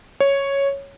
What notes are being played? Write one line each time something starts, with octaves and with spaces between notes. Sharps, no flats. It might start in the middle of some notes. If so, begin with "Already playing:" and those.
C#5